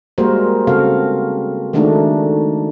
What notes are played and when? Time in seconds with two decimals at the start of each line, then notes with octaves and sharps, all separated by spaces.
0.18 G3 G#3 A#3 F#4 A#4 C5
0.67 C#3 C4 F#4 A4 F5
1.73 D#3 G#3 A3 D4 D#4 F#4